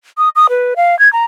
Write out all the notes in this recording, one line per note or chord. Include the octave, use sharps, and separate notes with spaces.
D#6
D#6
B4
F5
G#6
A#5